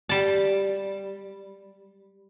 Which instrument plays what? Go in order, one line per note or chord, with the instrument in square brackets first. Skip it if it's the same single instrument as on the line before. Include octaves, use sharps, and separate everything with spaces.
[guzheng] G3 A5